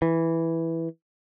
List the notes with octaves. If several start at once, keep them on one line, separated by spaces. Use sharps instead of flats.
E3